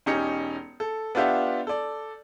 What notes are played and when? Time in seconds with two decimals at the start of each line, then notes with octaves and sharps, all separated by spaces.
0.06 E1 C#4 D#4 G4 C#7
0.80 A4
1.15 B3 D4 F4 G4 E5 F#5
1.67 A4 D5